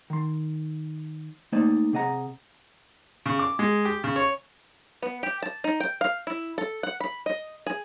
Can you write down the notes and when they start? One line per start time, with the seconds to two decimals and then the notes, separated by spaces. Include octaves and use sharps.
0.10 D#3 C6
1.52 A3 A#3 D#4 C5 D5 D#5
1.93 C3 G#4 D#5 F#5 A#5
3.26 C#3
3.39 D6
3.59 G#3
3.85 G4
4.04 C#3
4.16 C#5
5.02 B3
5.23 G4
5.43 A5
5.64 D#4
5.80 G5
6.01 F5
6.27 E4
6.58 A4
6.83 F#5
7.00 B5
7.26 D#5
7.67 G#4